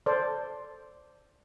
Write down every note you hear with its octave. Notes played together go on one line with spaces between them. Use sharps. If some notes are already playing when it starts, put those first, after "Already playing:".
A4 C5 D5